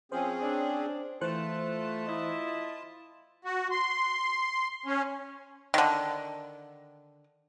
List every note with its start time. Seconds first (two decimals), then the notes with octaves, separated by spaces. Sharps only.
0.12 F3 C4 C#4 G#4 C5
0.42 D4
1.21 E3 A3 F4 C5 A5 F#6
2.07 E4 D#5
3.45 F#4
3.71 C6
4.86 C#4
5.74 D3 D#3